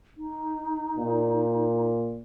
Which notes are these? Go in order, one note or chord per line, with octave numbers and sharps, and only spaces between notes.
D#4
A#2